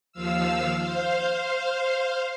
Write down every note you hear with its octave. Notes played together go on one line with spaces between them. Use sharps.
D#2 F3 F5 E6
C5 F5